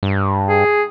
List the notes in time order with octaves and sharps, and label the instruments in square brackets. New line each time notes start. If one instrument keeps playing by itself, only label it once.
[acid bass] G2
[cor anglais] G#4